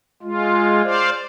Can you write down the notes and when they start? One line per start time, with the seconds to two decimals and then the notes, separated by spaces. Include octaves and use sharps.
0.23 G#3 F4
0.84 C5 D5 F5